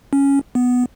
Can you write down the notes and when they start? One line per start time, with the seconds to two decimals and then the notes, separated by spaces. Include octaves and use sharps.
0.13 C#4
0.55 B3